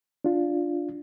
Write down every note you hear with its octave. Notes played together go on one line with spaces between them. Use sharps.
D4 F4